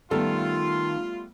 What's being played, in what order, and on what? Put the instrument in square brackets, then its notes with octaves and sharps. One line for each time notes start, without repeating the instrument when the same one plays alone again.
[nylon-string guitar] D#3 [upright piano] G3 A3 B3 [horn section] F4 [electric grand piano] A4